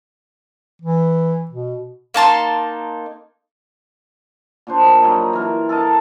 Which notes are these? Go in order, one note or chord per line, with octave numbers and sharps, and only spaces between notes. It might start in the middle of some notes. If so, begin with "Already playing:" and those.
E3
B2
A#3 D#4 A5 C6
A#2 D4 C5
F#3 G3 D#4
E3 A#4
A4 A#4 D#5 A5